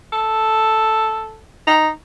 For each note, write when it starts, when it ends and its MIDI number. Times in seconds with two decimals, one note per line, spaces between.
0.12 1.41 69
1.67 1.90 63